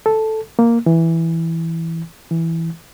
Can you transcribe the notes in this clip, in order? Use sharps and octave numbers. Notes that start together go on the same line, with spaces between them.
A4
A#3
E3
E3